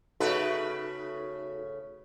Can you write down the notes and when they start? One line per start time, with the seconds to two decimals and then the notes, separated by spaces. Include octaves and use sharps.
0.20 C#3 A3 D#4 F#4 A4 B4